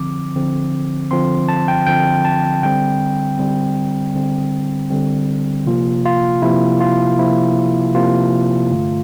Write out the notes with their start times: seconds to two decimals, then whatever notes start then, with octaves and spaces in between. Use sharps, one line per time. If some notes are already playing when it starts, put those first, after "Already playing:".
Already playing: D3 F3 C4 D6
0.35 D3 F3 C4
1.11 D3 F3 C4 C6
1.48 A5
1.68 G5
1.86 D3 F3 C4 G5
2.25 A5
2.63 D3 G3 C4 G5
3.39 D3 G3 C4
4.15 D3 G3 C4
4.90 D3 G3 C4
5.66 C3 F3 A#3 F4
6.05 F4
6.42 C3 F3 A#3 E4
6.80 F4
7.19 C3 F3 A#3 E4
7.95 C3 F3 A#3 F4
8.71 G2 D3 A3